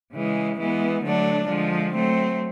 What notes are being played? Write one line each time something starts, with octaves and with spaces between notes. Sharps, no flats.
C#3 E3 G#3
E3 G#3 B3
D3 F#3 A3 D4
D3 F3 G#3
F#3 A3 C4